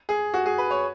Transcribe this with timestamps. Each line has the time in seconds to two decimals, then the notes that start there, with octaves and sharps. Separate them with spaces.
0.09 G#4
0.34 F#4
0.46 G#4
0.58 B4
0.71 C#5